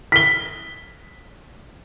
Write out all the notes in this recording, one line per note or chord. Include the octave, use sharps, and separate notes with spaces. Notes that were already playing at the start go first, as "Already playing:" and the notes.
B6 G7